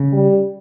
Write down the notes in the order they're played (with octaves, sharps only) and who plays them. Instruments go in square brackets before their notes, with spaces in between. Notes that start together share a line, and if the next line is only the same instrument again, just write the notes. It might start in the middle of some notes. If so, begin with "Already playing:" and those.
Already playing: [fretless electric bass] C#3
[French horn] G3